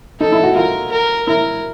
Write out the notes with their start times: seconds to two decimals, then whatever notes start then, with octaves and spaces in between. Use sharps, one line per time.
0.20 D#4 A4
0.32 E4
0.43 F#4
0.56 F4 A#4
0.92 A#4
1.27 E4 A#4